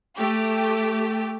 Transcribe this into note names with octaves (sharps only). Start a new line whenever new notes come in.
A3 G4